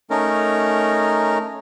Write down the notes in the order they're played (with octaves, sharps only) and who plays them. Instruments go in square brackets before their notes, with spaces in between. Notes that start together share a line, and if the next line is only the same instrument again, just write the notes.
[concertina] A3 C#4 D#4 A#4